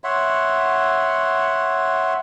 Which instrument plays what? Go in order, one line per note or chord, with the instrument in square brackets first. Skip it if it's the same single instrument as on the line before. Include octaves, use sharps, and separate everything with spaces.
[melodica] C#5 E5 F#5 C6